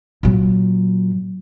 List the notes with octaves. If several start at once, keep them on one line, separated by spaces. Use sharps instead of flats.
A#2 F#3